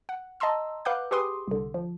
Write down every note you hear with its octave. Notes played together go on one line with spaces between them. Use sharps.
F#5
D#5 A5 A#5 C6 E6
B4 F5 F#5 D6 F#6 G6
G4 G#4 B4 C6 D6 D#6
C2 D3
F3